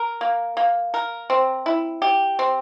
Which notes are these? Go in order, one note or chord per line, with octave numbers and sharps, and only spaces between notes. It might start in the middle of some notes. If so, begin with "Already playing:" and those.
Already playing: A#4
A#3
A#3
A#4
C4
E4
G4
C4